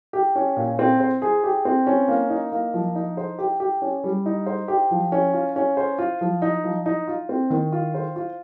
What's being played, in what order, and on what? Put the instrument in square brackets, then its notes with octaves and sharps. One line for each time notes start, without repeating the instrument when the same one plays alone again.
[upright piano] G4
C#4
A#2
C4
C5
G#4
G4
C4
C#4
A#3
D#4
A#3
F3
D#4
C5
G4
G4
C#4
G3
D#4
C5
G4
F3
C#4
F4
C#4
C5
F4
F3
D#4
F3
D#4
F4
C4
D#3
F4
C5
F4